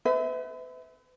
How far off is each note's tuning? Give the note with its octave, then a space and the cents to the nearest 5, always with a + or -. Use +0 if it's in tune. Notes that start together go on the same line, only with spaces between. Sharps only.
B4 +40 E5 -25